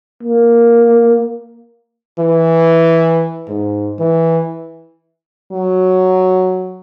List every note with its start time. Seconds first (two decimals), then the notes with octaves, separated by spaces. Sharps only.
0.23 A#3
2.19 E3
3.48 G#2
3.99 E3
5.52 F#3